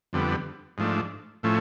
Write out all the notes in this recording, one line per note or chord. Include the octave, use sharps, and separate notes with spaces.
F2 D3 G3 B3
G#2 F3 A3 D4
A2 F3 A3 C#4